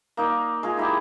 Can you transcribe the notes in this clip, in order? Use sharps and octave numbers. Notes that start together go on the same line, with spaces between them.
A#3 D#4 D5
G#3 F4 G#4
D#4 E4 G4